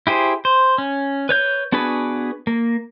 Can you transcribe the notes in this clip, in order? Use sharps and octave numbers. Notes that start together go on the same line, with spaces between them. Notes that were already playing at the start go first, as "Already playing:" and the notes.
E4 G4 G#4 C5
C5
C#4
B4 C#5 G6
B3 D4 F#4 G#4 B4
A#3